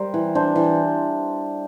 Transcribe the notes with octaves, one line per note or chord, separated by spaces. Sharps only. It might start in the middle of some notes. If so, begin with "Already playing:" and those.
Already playing: G3 A#4 C5
E3
D4 C5
E3